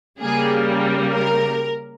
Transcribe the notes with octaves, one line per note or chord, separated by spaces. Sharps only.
C#3 G3 A#3 G#4
A#4